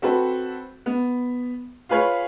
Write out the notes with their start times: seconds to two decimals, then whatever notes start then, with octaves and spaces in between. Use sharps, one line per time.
0.02 C4 F#4 A4 B4
0.86 B3
1.89 F4 G#4 B4 C#5 F5